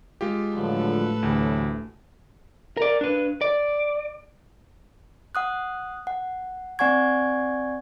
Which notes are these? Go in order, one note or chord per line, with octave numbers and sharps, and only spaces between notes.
G#3 F4 G4
A2 D3 F3 F#3 A4 B4
D2 E3 F#3 G4
A#4 D5
D4 B4
D5
F#5 D#6 F#6
F#5
C4 D5 F#5 G#5 C#6 G#6